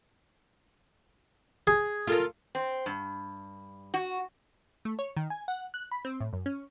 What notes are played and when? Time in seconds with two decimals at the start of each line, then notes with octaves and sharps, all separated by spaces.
1.67 G#4
2.07 F4 A4 A#4
2.55 C4
2.86 G2
3.94 F#4
4.85 A3
4.99 C#5
5.17 D#3
5.30 G#5
5.48 F#5
5.74 F#6
5.92 B5
6.05 C4
6.20 A2
6.33 F#2
6.46 C#4